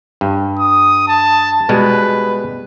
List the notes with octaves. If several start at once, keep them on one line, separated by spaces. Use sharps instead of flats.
G2
D#6
A5
B2 G3 G#3 B4